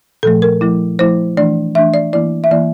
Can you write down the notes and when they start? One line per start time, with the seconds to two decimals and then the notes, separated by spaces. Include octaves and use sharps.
0.23 A#2 F3 A3 A4
0.42 A#4
0.61 F3 A3 E4
0.99 F3 A3 E4 C5
1.37 E3 A3 D4 D5
1.75 E3 A3 D4 E5
1.94 D5
2.13 E3 A#3 E4 D5
2.44 E5
2.51 E3 A#3 E4 D5